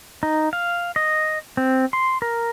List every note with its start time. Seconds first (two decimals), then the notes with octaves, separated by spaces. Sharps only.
0.23 D#4
0.53 F5
0.96 D#5
1.57 C4
1.93 C6
2.22 A#4